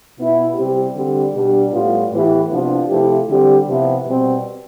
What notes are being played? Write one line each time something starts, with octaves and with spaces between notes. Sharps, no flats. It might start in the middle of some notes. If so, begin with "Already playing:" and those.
B2 B3 E4
C3 G3 C4 G4
D3 G3 C4 G4
B2 G3 D4 G4
A2 G3 B3 F4
A2 E3 B3 E4 G4
C3 F3 B3 D4 F4
C3 F3 A3 E4 G4
D3 G3 C4 G4
C3 F3 B3 E4
B2 G3 C4